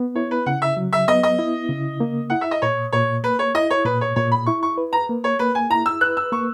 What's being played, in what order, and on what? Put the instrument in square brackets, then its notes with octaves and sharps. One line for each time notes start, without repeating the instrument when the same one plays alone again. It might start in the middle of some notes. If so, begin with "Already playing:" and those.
Already playing: [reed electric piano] B3
[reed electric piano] E4 [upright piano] C#5
[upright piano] B4
[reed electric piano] C#3 [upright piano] F#5
[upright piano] E5
[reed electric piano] F#3
[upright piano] E5
[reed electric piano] B3 [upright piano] D#5
[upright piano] D#5
[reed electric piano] E4
C#3
A#3
[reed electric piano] E4 [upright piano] F#5
[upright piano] E5
D#5
[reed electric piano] A#2 [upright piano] C#5
[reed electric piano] A#2 [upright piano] C#5
[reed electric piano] A#3 [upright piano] B4
[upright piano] C#5
[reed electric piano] E4 [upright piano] D#5
[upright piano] C#5
[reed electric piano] A#2 [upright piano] B4
[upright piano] C#5
[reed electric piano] A#2 [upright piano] C#5
[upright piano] B5
[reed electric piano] E4 [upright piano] C#6
[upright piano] C#6
[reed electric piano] B4
[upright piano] A#5
[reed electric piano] A#3
[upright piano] C#5
[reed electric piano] A#3 [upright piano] B4
[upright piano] G#5
[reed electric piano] E4 [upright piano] A#5
[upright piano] E6
[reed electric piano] B4 [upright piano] F#6
[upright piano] E6
[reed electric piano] A#3 [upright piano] C#6